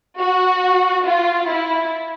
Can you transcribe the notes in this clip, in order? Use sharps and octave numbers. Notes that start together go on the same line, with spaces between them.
F#4
F4
E4